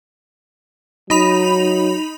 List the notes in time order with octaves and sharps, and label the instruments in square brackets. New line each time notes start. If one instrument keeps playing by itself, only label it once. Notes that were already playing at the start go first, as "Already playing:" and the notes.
[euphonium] F#3 [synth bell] D#4 B5 F7